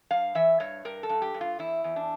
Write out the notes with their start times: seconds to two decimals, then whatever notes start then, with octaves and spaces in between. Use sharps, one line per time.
0.10 G2 F5
0.35 E3 E5
0.60 G2 C#5
0.85 G2 A#4
1.03 A4
1.09 G2
1.22 G4
1.34 G2
1.41 F4
1.59 E2 E4
1.84 E2
1.96 D4